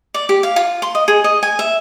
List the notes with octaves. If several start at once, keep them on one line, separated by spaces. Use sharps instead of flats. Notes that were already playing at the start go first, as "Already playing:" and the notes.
D5
G4
F5
F4
C6
D#5
G#4
D#5
G#5
E5